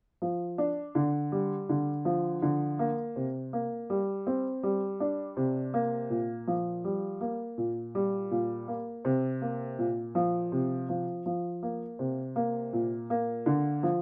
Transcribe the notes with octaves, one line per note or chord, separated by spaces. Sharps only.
F3
D4
D3
G3
D3
F3
D3
A#3
C3
A#3
G3
C4
G3
D4
C3
A#3
A#2
F3
G3
A#3
A#2
G3
A#2
A#3
C3
A#3
A#2
F3
C3
F3
F3
A#3
C3
A#3
A#2
A#3
D3
F3